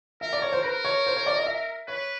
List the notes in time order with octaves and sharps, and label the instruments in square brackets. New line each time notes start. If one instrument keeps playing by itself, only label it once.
[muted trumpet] A#4 [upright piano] E5
[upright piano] D5
C#5
C5
[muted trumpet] A#4 [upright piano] B4
[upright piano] C#5
C5
C#5
D5
D#5
E5
[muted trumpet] B4 [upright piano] C#5